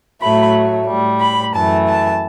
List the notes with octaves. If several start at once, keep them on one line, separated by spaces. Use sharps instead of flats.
A2 F#3 A3 B5
A2 G3
B5
F#2 E3 A3 A5
A5